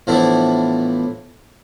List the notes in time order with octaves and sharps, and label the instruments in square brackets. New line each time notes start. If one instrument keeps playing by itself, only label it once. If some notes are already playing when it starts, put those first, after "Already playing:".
[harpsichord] A2 E3 F3 B3 D4 E4